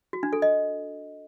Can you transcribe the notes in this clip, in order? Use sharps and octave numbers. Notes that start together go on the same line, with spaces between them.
F#4
D4
A4
D#5